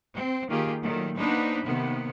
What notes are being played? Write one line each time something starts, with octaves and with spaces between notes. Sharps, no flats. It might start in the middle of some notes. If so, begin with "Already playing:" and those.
C4
D#3 A#3 F4 G4 G#4
A#2 D#3 F#3 A3
A#3 B3 D4 D#4 B4 C5
C3 D#3 A#3 B3